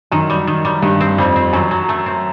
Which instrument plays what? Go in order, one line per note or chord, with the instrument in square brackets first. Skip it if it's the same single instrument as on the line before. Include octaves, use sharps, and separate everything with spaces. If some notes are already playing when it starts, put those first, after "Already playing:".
[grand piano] F#2 [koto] D#3
[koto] G3
D#3
G3
[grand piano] G2 [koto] D#3
[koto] C4
[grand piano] F2 [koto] G3
[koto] C4
[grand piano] F#2 [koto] F#3
[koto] F#3
A3
C4